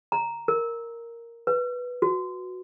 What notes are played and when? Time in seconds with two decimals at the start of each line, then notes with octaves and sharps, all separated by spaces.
0.12 A#5
0.48 A#4
1.47 B4
2.02 F#4